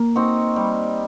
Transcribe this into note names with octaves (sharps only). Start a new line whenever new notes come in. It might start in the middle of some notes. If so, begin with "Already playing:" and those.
Already playing: A#3
C4 D#4 F#4
G3